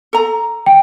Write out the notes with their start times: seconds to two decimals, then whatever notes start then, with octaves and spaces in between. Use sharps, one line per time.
0.13 A4 A#5
0.66 G5